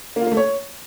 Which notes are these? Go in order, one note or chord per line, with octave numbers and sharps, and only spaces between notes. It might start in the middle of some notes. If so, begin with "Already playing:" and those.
A#3
F4
A#3
A3
C#5